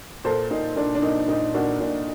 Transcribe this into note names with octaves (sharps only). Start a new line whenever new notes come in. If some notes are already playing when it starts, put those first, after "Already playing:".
A#2 A4 C5
A#2 D#4
A#2 D4
D4
A#2 D#4
A#2 D#4
A#2 D4 F#4
A#2 D4